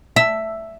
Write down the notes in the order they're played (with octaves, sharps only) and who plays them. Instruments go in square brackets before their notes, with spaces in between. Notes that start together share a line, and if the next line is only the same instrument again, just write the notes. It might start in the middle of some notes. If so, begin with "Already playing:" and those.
[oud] E5